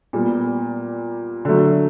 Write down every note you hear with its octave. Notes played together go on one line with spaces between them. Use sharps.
A#2 G3 B3
D3 F#3 A3